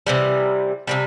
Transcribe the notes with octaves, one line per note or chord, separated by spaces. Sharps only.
C3 E3 G3
C3 E3 G3